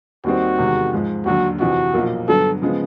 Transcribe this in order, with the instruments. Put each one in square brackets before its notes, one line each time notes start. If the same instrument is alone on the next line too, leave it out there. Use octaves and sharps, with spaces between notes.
[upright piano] D#2 D#3 G3 C4 D#4 [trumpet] F#4
[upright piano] E2 C3 D#3 G#3
G#2 F3 G#3
[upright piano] D#2 D3 F#3 [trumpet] F#4
[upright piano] F2 C3 E3 [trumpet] F#4
[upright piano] B1 A#2 F3 A#3
[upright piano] G2 D3 F#3 B3 [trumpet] A4
[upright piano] C#3 F3 G#3 B3